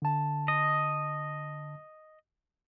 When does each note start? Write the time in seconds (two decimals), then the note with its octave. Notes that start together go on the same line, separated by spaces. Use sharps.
0.02 D3 A5
0.48 D#5